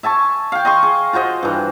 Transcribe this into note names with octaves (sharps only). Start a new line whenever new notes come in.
E5 G#5 A5 C#6
F5 G5
D#5 C6 C#6
G#4
F4 F#4 C5 D#5
G2 E3